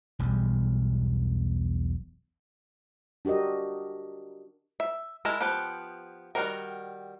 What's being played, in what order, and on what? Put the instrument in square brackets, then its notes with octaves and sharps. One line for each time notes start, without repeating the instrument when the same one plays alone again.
[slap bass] E1 B1 E2 G3
[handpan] D4 F#4 G4 A#4 D#5
[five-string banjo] E5
G#3 E4 A#4 A5 A#5
F3 B3 G4 B4
D#3 G3 B3 F#4 A#4